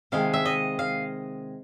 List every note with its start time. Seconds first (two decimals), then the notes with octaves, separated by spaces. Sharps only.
0.12 C3 D#3 G#3 F5
0.34 E5
0.45 D#5
0.79 F5